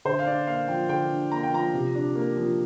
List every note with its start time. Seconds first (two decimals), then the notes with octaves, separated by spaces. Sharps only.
0.05 D3 C5
0.19 F5
0.26 D4 D5
0.47 A#3 F5
0.68 F3 G5
0.89 D3 G5
1.10 D4
1.31 A#3 A#5
1.43 G5
1.52 F3 A#5
1.73 C3
1.95 D4
2.15 A#3
2.37 F3